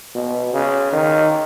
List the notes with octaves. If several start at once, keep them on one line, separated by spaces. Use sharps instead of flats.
B2
C#3
D#3